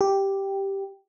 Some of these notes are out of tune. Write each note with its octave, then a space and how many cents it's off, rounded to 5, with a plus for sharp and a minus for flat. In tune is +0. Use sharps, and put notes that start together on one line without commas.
G4 +0